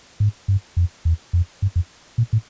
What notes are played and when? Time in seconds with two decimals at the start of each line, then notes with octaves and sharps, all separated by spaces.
0.20 G#2
0.48 G2
0.77 F2
1.05 E2
1.33 F2
1.62 G2
1.76 F2
2.18 A#2
2.33 A2